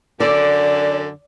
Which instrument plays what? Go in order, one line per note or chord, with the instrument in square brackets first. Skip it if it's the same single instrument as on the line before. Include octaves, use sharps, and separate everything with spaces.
[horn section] F#2 D3 [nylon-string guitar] D5